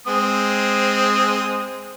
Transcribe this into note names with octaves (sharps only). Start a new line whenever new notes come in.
G#3 C4 D#6